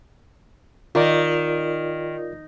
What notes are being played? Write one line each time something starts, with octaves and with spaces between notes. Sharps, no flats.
D#3 F4 A#4 D5